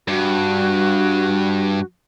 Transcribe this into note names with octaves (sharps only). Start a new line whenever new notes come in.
G2 F#4